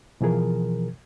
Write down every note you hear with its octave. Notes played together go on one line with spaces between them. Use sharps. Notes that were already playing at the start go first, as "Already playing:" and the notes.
B2 E3 F3 G#4 A#4